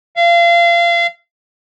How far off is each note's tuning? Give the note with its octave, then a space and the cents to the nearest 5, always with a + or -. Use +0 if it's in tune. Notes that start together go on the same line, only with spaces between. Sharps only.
F5 -30